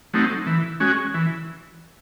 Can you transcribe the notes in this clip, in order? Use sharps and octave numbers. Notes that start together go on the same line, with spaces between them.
F#3 A3 C4 D#4
E3
G#3 C#4 F#4
E3